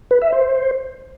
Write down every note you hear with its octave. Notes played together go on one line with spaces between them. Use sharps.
B4
E5
C5